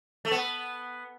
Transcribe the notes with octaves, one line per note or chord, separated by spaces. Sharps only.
A3
B3